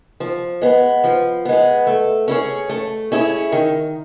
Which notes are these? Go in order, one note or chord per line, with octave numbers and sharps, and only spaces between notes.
F3
G#3 B3
F3
G#3 B3
A3
C#4 E4 G#4 C#5
A3
C#4 E4 G#4 C#5
D#3